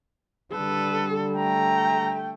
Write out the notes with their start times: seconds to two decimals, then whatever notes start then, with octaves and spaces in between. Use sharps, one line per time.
0.52 D3 G3 A4 B4
1.37 A3 G5 A#5